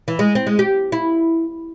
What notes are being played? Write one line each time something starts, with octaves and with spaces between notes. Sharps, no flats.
E3
G#3
C4
G#3
G4
E4